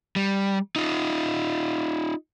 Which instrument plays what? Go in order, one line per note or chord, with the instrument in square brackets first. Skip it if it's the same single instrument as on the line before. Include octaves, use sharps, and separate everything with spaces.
[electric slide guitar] G3
D#4 F4